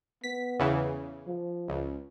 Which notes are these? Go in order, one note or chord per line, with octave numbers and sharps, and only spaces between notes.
B3 B6
E2 C#3 E3
F3
C#2